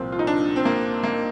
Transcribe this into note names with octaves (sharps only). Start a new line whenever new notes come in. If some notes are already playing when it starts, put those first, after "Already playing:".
Already playing: C2 A#2 F3 C4
F4
D#4
D4
C4
A#3
A#3